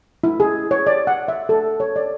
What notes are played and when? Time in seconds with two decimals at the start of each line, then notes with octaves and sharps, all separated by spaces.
0.24 E4
0.40 G#4
0.71 C#5
0.87 D5
1.07 F#5
1.28 E5
1.49 A4
1.80 C#5
1.96 D5